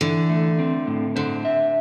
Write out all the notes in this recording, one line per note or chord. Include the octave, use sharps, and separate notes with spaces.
D3 E3
A3
C4
A2
D3 C5
E5